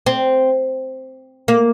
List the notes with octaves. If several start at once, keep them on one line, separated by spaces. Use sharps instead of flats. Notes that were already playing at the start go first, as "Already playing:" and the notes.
C4
A#3